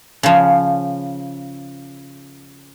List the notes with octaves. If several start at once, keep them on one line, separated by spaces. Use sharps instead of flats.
C#3 F3